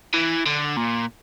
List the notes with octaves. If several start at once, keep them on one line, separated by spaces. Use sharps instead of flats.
E3
D3
A#2